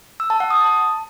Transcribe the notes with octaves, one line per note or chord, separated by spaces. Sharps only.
E6
A5
F#5
D#6
A5